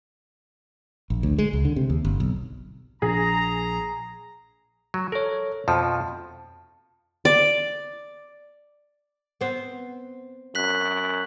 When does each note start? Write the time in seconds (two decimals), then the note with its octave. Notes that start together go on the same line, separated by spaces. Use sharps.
1.10 A#1
1.23 D2
1.38 G#3
1.53 C#2
1.65 D3
1.76 C3
1.90 D#2
2.05 G1
2.20 B1
3.02 A#1 G#4 A#5
4.94 F#3
5.12 A4 A#4 C#5
5.68 F2 B2 F3 A5
7.25 D5
9.41 B3 C4
10.55 F#2 F#6 B6 F#7